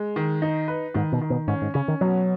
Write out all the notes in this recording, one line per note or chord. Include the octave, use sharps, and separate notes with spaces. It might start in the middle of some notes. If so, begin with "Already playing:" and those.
Already playing: G#3
D#3
D#4
B4
G#2 D#3
B2
D#3
B2
G#2 C#4
G#2
C#3 C#4
D#3
B2 F#3